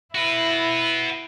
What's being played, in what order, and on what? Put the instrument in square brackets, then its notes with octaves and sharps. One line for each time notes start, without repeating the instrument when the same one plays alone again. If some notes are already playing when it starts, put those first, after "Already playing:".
[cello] E4 [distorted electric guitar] F#4 B4